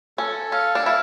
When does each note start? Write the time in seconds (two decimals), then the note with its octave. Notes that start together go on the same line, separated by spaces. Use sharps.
0.18 C#4 A4
0.52 C#4 F5
0.75 D4
0.86 E4 F5